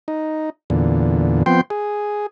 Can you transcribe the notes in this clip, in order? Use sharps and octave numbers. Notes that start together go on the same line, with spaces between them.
D#4
E2 A#2 D3
F3 B3 C4 G5 C6
G#4